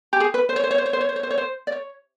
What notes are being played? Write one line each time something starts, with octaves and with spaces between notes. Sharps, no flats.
G4
G#4
B4
C5
C#5
C5
C#5
C5
C#5
C5
C#5
C5
C#5
C5
C#5
C5
D5
C#5